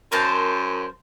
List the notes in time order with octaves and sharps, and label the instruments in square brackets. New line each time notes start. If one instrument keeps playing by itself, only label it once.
[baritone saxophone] F#2 [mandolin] A#4 C5 A5